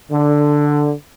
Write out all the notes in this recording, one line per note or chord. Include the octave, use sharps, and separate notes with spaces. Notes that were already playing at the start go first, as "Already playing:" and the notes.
D3